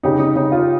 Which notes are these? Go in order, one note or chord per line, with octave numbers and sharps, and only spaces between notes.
C#3 D#4 G4
D#4
C#3 D#4
F4